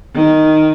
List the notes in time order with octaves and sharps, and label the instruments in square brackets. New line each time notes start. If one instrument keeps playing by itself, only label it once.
[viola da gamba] D#3